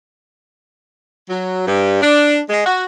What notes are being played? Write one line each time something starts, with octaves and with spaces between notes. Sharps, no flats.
F#3
G2
D4
G#3
F#4